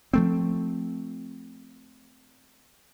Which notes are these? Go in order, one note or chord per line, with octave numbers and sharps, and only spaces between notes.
F3 A3 C4